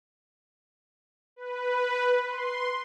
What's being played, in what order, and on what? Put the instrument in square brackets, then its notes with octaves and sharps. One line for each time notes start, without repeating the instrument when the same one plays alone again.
[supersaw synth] B4
C6